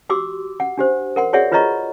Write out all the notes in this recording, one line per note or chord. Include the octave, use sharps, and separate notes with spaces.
F#4 G4 C6 D6 E6
F#5
D4 G4 C5
A#4 F#5 C6
F#4 G#4 C#5 D5 E5 F#5
F4 B4 C#5 D#5 A#5 C#6